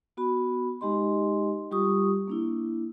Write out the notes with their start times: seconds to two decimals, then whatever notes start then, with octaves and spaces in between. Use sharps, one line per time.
0.17 B3 F#4 B5
0.81 G#3 D#4 G4 D#5 C6
1.71 G3 F4 G4 C#6 D#6
2.28 A#3 D4 E4